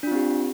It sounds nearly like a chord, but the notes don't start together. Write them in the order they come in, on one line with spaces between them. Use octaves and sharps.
D4 F4 C4 G4